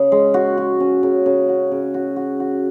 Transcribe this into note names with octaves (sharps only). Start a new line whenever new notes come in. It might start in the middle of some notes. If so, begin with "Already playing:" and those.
Already playing: C#3
G#3
F#4
F#4
C#4
C#3
C#3
F#4
C#3
F#4
F#4
F#4